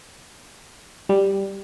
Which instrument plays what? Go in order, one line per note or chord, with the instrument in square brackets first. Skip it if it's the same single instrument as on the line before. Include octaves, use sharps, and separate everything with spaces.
[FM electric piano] G3